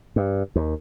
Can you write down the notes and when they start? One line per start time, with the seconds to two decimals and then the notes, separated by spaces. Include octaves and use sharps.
0.16 G2
0.56 D#2